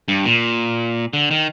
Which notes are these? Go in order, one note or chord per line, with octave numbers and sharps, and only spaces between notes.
G2
A#2
D3
D#3